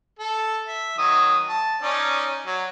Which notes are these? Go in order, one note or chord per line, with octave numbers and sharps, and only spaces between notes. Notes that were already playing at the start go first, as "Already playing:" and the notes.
A4
E5
D#3 F#3 D#6
A5
C#4 D#4 D5
F#3